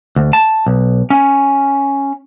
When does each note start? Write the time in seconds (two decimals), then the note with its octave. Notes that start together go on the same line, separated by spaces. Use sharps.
0.16 D2
0.33 A5
0.67 B1
1.10 C#4